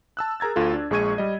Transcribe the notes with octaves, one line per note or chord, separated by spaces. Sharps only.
A5 E6 F#6
G#4 A#4 A#5 G#6 A6
D2 F4 A4
D4
A#1 G#3 G#4 C#6 G#6 D#7
G3 D#5